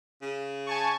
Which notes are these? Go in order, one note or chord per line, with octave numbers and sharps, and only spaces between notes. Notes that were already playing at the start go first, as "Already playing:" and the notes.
C#3
G#5 A5 C#6